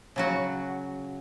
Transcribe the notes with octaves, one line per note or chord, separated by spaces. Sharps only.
C#3 F#3 F#4